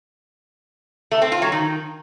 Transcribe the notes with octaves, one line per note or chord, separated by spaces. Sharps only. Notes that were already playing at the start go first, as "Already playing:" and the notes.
A3
C4
F4
F#3
D#3